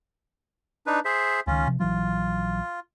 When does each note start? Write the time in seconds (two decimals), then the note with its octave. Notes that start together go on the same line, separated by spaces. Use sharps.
0.86 D4 D#4 B4
1.05 G#4 C5 E5
1.47 C#2 D#3 C#4 F4
1.67 C3 F3
1.80 A#1 E3 F#3 F4